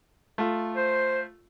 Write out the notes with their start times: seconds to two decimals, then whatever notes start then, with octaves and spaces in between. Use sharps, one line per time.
0.38 A3 F4
0.76 C5